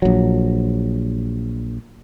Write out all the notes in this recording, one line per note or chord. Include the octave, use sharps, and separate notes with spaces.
A#1 F#3